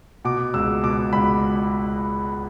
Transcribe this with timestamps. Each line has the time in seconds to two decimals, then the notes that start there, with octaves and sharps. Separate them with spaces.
0.25 B2 D6
0.54 C#2 E6
0.83 B2 D6
1.13 C#2 B5